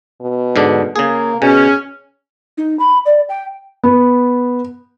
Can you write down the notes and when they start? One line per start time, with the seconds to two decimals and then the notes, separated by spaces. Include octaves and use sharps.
0.21 B2
0.56 G#2 D3 D4
0.96 C#3 A#3 G#4
1.42 B2 C#4 G#4
2.58 D#4
2.79 B5
3.06 D5
3.29 G5
3.84 B3